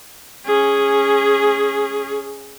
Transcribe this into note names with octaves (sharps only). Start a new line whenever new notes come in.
C#4 G#4